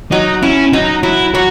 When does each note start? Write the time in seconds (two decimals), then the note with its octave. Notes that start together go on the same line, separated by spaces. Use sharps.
0.11 F#3 D#4
0.42 C#4 E4
0.73 F#3 D#4
1.03 F#3 E4
1.34 F#3 F#4